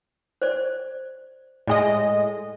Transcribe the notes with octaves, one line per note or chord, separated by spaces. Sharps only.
C5 D5
A2 G#3 D5 D#5 G#5